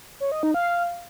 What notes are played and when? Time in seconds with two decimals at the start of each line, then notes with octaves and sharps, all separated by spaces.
0.20 C#5
0.32 D#5
0.43 D#4
0.54 F5